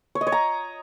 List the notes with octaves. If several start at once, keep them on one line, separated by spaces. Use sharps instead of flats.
C#5
D#5
C#5
A#5